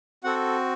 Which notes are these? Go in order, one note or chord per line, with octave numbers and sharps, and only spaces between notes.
C4 F#4 A4 F#5